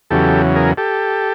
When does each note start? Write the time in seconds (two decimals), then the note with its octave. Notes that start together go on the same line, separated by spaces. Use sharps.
0.10 E2 C#3 F#3 G4 A4
0.56 G#4 A#4
0.77 G4 A4